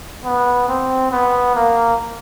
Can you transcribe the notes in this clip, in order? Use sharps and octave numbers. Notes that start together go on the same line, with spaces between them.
B3
C4
B3
A#3